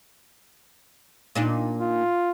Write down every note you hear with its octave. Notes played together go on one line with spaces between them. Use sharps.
A#2 D4 D#4
F4